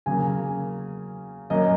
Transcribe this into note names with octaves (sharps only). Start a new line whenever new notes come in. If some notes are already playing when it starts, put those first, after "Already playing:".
C#3 F#3 A#3 G#5
F#2 F#3 A#3 D#5